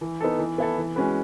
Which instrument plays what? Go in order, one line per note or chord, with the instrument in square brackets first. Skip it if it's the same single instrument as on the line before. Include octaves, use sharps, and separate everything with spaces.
[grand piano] E3
B3 D#4 A4
E3
B3 E4 A4
E3
G#3 C#4 F#4 B4